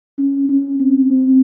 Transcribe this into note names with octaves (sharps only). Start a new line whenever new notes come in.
C#4
C#4
C4
C4